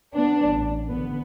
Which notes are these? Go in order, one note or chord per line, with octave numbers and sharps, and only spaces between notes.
B3 D4
A1
D3 B3